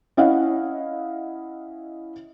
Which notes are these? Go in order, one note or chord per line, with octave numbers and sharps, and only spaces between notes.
C#4 E4 D#5 F5 F#5